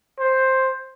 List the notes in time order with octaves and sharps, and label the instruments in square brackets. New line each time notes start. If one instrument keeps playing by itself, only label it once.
[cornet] C5